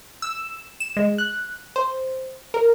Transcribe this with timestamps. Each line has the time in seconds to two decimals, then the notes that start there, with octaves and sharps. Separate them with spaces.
0.22 E6
0.80 E7
0.97 G#3
1.18 F#6
1.76 C5
2.54 A#4